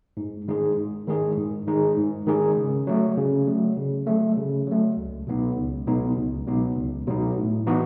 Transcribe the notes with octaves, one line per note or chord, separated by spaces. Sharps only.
G#2
D#3 G#3 D#4 G#4
G#2
D#3 G#3 D#4 G#4
G#2
D#3 G#3 D#4 G#4
G#2
D#3 G#3 D#4 G#4
C#3
F#3 A3
C#3
F#3 A3
C#3
F#3 A3
C#3
F#3 A3
C#2
B2 F#3 B3 D#4
C#2
B2 F#3 B3 D#4
C#2
B2 F#3 B3 D#4
C#2
B2 F#3 B3 D#4
A2
E3 B3 D#4 F#4